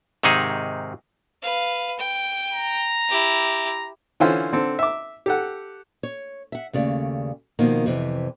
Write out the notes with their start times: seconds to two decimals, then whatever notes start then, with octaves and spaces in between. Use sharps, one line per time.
0.23 G#2 C3 D#3 D#4 G#4
1.42 B4 F5
1.99 G5
2.53 A#5
3.09 E4 G4
4.20 D3 E3 C#4 E4 F4 C5
4.53 D3 C4 A4
4.79 E5 D6
5.26 G4 A4 F#5
6.03 C#5
6.52 E5 F#5
6.73 D#2 C#3 A3 D5
7.59 B2 D#3 F3 A#3
7.86 F2 C3 E3